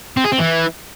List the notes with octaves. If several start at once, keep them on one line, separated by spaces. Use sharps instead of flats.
C4
G#4
C4
E3